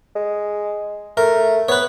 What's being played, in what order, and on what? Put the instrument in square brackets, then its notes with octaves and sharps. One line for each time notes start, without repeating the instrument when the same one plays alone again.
[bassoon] G#3
[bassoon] A3 [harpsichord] A#4
[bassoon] B3 [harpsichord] B4 C#5